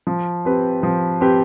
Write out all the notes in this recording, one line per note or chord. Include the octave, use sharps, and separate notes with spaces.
F3
C4 G4 B4
F3
C4 G4 B4